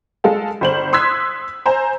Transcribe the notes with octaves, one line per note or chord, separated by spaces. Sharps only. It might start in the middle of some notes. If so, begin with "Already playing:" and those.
G#3 A4 F5
G1 C5 F#7
C6 D#6 E6 F#6 G#6 B6
C5 G#5 A#5